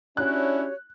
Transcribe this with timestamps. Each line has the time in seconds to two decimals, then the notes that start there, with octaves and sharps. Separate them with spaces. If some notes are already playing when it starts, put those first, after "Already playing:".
0.17 C#4 D4 E4 F#4 G4 C#5 F#6